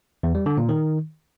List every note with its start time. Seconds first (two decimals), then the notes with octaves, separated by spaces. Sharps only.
0.23 E2
0.35 G3
0.46 D3
0.58 A#2
0.69 D#3